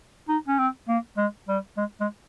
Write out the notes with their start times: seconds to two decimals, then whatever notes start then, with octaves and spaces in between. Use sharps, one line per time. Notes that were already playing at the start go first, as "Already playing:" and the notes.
0.28 D#4
0.48 C#4
0.59 C4
0.89 A#3
1.17 G#3
1.48 G3
1.77 G#3
2.00 G#3